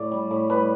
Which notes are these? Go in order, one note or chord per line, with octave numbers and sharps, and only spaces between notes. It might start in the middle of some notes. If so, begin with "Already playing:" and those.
Already playing: A2 D5
G3
A2
G3 B4